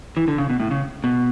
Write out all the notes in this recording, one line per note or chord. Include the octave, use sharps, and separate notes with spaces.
E3
D3
C#3
B2
A2
C#3
B2